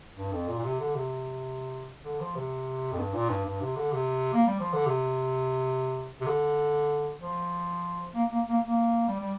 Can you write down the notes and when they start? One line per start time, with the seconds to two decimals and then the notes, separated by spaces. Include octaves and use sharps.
0.17 G2
0.33 F2
0.48 A#2
0.59 A#2
0.64 C3
0.80 D3
0.95 C3
2.05 D3
2.20 F3
2.36 C3
2.92 F2
2.98 G2
3.14 A#2
3.30 G2
3.45 G2
3.61 C3
3.76 D3
3.93 C3
4.33 A#3
4.47 G3
4.60 F3
4.73 D3
4.86 C3
6.21 C3
6.27 D3
7.20 F3
8.15 A#3
8.32 A#3
8.49 A#3
8.66 A#3
9.08 G3
9.20 G3